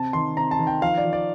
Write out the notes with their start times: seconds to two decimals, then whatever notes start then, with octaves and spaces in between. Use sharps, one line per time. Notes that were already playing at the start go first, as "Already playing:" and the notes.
Already playing: C3 A5
0.13 D#3 C6
0.37 C3 A#5
0.51 A5
0.59 D#3
0.67 G5
0.82 F3 F5
0.98 D5
1.04 F3
1.13 D5